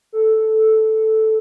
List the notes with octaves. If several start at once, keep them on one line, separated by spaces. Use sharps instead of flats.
A4